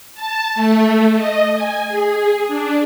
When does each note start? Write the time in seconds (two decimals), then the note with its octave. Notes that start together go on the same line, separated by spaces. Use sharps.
0.15 A5
0.55 A3
1.16 D#5
1.55 G#5
1.88 G#4
2.48 D4